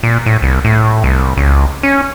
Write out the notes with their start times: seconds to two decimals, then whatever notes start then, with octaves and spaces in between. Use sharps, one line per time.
0.03 A#2
0.26 A2
0.42 C2
0.65 A2
1.04 C2
1.37 C#2
1.83 C#4